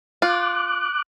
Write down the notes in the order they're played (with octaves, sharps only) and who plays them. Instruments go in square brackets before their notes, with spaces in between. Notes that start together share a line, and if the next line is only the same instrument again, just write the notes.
[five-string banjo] F4 [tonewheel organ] D6 F#6